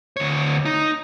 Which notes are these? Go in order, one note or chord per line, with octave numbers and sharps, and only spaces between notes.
D2 C#5
D#4